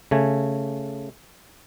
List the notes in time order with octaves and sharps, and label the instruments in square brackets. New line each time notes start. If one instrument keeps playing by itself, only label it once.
[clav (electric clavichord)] C#3 A3 G#5